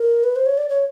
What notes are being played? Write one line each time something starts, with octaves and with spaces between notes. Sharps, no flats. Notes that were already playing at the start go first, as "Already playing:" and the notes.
Already playing: A#4
B4
C5
C#5
D5
C#5